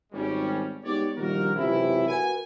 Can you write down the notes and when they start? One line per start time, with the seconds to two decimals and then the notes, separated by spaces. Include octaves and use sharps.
0.13 G#1 G3 C#4
0.84 G#3 B3 D#4 G4 C#5 D5
1.17 A#1 D#3 G3 A#3 F#4 A#4
1.55 C#2 F#2 C3 E3 E4
2.07 F#4 A#4 B4 F#5 G#5